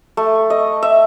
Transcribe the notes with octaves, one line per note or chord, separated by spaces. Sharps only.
A3
D#5
E5